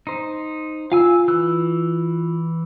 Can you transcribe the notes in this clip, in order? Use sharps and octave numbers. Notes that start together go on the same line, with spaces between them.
D#4 C5
F4 F5 G#5 E6
E3 E6 F#6